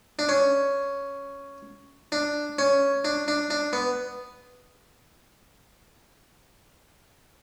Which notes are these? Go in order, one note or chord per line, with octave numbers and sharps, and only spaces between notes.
D4
C#4
D4
C#4
D4
D4
D4
B3